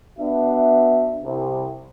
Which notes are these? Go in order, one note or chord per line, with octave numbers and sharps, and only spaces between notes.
B3 D4 F#4 E5
C2 C3